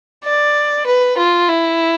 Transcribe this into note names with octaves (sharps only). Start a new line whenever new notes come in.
D5
B4
F4
E4